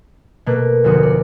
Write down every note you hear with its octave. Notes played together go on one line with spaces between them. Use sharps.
B2 A3 A#3 F#6
F1 D2 F#4 D#6 C#7
D5